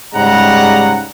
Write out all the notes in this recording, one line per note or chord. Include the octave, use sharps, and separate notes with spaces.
G#2 C#3 G3 F#5 A#5